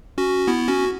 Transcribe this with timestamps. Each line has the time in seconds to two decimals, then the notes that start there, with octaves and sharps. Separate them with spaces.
0.18 C#4 F#4
0.48 B3 E4
0.68 C#4 F#4